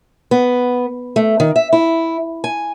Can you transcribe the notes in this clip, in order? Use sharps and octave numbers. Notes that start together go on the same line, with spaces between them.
B3
A3
D#3
E5
E4
G#5